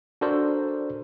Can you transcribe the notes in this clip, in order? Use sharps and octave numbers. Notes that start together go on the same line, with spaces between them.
D4 F#4 A4 A#4 C5 D5